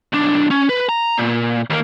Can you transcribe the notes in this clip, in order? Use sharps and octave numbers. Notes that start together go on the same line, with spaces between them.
B1 D4
C#4
B4
A#5
A#2
D#2 A#3